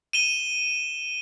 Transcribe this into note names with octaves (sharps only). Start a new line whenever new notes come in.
D#7 E7 G7